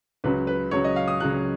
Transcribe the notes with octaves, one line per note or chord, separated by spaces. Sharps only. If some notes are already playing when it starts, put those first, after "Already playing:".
C#2 C#3 F#3 B4
B4
C#2 C#3 F#3 C#5
D#5
F5
D#6
C#2 C#3 F#3 F#6